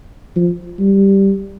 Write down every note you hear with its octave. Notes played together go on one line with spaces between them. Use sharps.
F3
G3